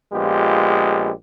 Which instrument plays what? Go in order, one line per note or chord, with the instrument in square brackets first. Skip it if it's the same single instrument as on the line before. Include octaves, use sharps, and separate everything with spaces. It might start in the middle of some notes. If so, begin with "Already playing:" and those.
[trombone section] A#1 G#3 B3 F4 G4